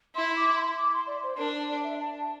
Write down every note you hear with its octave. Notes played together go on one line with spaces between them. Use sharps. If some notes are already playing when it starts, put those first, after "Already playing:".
E4 C6
D6
C6
D6
C6
D5
C5
D4 A#4
D5
E5
A5